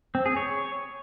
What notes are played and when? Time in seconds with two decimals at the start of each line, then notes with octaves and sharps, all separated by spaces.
0.15 C4
0.26 G#4
0.37 C#5